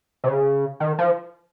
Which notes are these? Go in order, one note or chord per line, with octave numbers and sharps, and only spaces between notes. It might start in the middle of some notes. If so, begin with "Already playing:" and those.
C3
C#3
D#3
F3